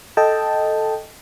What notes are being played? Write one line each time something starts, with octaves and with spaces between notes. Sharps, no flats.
A4 D#5 G5 A5